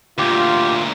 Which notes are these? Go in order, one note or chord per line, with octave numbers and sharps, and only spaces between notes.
D2 A#2 F4 G4